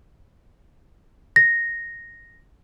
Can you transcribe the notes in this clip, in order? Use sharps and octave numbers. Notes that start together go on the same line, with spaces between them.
A#6